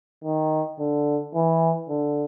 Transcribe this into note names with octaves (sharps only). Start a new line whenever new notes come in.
D#3
D3
E3
D3